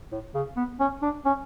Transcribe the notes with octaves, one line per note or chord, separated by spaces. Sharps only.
A2
C#3
B3
C#4
D4
C#4